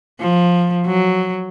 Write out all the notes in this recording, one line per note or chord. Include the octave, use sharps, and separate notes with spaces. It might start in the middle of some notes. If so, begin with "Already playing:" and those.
F3
F#3